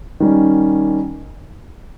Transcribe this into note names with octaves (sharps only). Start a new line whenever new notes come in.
D#3 G3 C#4